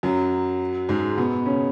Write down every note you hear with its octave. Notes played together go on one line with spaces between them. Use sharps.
F#2 F#3
G#2 G#3
B2 B3
C#3 C#4